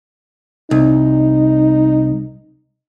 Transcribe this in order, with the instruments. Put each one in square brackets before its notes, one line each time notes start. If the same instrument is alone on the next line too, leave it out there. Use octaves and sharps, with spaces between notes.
[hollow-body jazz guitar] C2 [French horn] D#4